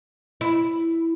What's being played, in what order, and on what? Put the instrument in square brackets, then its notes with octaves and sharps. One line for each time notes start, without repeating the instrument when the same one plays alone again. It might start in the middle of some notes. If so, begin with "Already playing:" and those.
[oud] E4